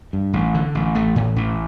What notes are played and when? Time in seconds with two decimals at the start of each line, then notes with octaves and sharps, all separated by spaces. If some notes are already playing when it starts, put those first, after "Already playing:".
0.13 G2
0.33 A1
0.54 D3
0.75 A1
0.95 A1 A3
1.16 A2
1.36 A1